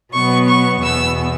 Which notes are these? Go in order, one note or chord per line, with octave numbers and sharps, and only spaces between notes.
B2 F#3 B3 C#6
C#6
E2 B2 B3 E6